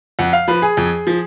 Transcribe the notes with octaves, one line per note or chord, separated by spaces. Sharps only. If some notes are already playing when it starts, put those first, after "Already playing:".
F2 F#5
F5
F3 B4
G#4
F2
F3